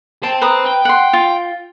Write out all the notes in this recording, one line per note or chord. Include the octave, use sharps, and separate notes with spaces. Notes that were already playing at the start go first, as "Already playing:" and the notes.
C5 G5 A5
B4 A#5 D#6
G5
F#5 C6
F4